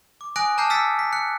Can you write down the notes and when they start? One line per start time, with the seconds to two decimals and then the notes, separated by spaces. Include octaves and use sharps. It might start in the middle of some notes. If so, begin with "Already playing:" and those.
0.21 D6
0.36 G#5 D#6 F#6 A#6 D7
0.58 A5 A#5 D6 F6 G6 C7
0.70 E6 F6 A6 B6 C#7
0.99 B6
1.13 F#6 C#7